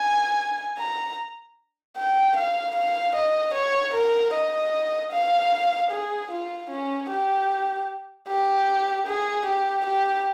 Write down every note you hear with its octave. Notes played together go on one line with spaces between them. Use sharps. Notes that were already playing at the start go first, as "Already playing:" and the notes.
Already playing: G#5
A#5
G5
F5
F5
D#5
C#5
A#4
D#5
F5
G#4
F4
C#4
G4
G4
G#4
G4
G4